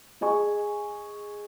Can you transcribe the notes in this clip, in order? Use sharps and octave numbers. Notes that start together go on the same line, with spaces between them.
G#4 D#5 G#5 C#6